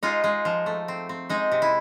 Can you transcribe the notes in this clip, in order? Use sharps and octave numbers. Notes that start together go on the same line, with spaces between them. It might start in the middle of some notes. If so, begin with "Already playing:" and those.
G#3 D#4 F4
G#3
F3
A3
C4
C4
G#3 D#4
C3
E4